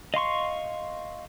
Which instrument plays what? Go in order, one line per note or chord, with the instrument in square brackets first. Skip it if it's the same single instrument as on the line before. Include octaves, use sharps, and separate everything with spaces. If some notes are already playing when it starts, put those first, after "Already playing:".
[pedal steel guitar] D#5 F5 C6 C#6